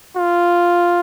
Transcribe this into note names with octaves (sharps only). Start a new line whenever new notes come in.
F4